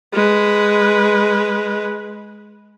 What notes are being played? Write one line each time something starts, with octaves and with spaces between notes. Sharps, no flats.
G#3 B4